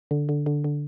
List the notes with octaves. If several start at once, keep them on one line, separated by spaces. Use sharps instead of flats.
D3
D3
D3
D3